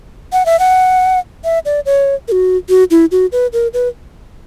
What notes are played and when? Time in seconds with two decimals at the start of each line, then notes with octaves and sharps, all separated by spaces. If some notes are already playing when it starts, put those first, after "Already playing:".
0.33 F#5
0.46 E5
0.60 F#5
1.44 E5
1.65 D5
1.86 C#5
2.28 A#4
2.32 F#4
2.69 F#4
2.91 E4
3.12 F#4
3.32 B4
3.53 A#4
3.74 B4